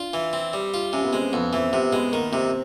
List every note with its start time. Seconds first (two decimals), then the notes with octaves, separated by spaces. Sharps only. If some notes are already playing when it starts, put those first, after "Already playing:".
Already playing: D4 F4
0.13 E3
0.33 C4
0.53 G3
0.74 F4
0.93 C3 C#4
1.04 B3
1.13 G#3 C4
1.33 F2 B3
1.53 E3 C4
1.73 C3 B3
1.93 G#3 B3
2.13 D#3 A#3
2.32 C3 C4